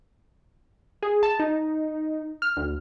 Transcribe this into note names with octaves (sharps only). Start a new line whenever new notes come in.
G#4
A5
D#4
F6
D2